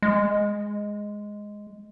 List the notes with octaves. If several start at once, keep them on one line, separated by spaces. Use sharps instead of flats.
G#3